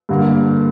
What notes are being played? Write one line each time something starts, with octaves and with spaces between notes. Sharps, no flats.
G2 D3 A#3